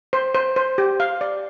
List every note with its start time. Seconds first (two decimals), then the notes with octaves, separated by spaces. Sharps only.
0.13 C5
0.35 C5
0.56 C5
0.78 G4
1.00 F5
1.21 D5